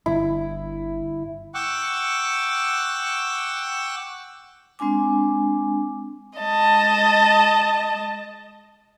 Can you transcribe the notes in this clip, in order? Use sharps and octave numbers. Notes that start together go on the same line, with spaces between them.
G1 G2 D3 E4
F#5 G5 C#6 D6 E6 F#6
G#3 C4 D4 G#5 D6
G#3 D#5 A5